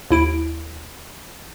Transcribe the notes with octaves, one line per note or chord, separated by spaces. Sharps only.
D#2 E4 D7